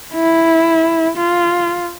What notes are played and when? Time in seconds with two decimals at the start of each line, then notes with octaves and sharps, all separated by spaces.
0.15 E4
1.18 F4